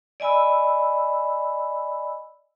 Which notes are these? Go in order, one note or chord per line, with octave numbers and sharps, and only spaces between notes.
D5 D#5 G#5 B5 E6